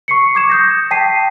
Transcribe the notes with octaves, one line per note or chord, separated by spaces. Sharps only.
C#6 C7 C#7
D6 G#6 E7
D#6 G6 A#6
G5 A5 B6 C7 D#7